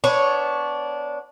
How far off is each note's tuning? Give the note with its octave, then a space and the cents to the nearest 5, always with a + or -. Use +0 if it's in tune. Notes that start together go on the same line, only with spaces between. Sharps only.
B3 +10 D4 -15 C#5 +0